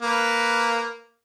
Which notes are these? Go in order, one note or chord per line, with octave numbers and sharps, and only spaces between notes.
A#3 B4